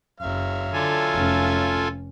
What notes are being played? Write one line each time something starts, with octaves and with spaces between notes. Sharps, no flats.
F#1 F#3 E5 F5
D3 F4 A4 G#5
F1 C#4